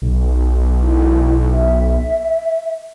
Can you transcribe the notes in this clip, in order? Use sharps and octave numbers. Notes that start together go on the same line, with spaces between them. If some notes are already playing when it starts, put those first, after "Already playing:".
B1
E4
E5